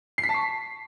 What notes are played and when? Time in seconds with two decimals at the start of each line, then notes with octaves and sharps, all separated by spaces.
0.18 C7
0.23 B6
0.29 A5
0.34 C#6